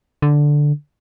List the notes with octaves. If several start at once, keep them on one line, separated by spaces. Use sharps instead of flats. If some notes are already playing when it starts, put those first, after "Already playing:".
D3